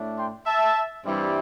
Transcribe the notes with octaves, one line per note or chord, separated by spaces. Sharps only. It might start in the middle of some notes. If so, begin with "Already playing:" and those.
Already playing: A2 A3 D4
G5 C6
E5 A5
G2 E3 G3 C4 E4